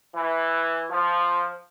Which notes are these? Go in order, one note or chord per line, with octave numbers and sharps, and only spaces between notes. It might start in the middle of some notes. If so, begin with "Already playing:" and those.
E3
F3